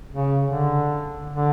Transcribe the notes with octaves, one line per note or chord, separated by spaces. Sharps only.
C#3
D3
D3